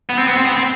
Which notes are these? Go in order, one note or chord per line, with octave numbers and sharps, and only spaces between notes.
B3
C4
B3
C4
B3
C4